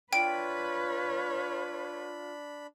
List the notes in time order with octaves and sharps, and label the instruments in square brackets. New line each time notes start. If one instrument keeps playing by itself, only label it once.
[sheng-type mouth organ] D4 B5 [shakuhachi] F4 [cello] B4 C#5 [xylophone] G5 D7